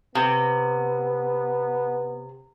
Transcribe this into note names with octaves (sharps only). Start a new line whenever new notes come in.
C3 B3